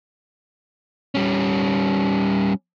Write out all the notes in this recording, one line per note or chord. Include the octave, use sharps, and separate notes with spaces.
G3 C#4